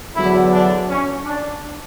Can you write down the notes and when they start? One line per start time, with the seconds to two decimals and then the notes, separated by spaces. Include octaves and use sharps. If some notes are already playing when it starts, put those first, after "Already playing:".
0.16 E2 D3 F#3 E4
0.52 D4
0.89 C#4
1.24 D4